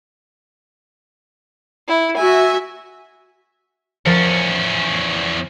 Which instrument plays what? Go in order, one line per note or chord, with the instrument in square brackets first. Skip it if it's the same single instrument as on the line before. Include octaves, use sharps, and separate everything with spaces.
[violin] E4
[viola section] F#4 E5 [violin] G#5
[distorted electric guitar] E2 C#4 [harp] F3 A#4 A6